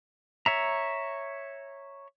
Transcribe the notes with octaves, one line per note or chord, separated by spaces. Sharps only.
C#5 E5 A#5